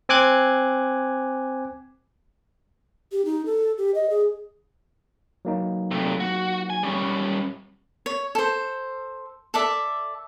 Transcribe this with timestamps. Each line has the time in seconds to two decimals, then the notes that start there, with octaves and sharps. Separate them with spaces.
0.09 C4 G#5 D6 F#6 G#6
3.12 G4
3.25 D#4
3.46 A4
3.78 G4
3.95 D#5
4.10 G#4
5.45 F#3 A#3 D#4
5.91 C3 A3
6.20 F#4
6.70 G#5
6.83 G3 C#4
8.06 C#5
8.35 A4 C5
9.54 A4 D5 E5